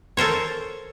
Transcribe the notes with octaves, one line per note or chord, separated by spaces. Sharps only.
A4 A#4 C5 C#5